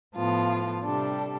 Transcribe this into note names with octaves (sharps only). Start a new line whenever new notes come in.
A2 F3 B3 F4 A4
C3 G3 D4 A4